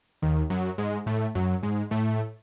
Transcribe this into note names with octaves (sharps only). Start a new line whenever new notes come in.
D#2 D#3
F#2 F#3
G#2 G#3
A2 A3
F#2 F#3
G#2 G#3
A2 A3